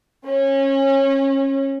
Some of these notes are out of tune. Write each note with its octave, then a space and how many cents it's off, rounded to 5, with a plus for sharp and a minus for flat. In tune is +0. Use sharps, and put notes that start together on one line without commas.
C#4 -25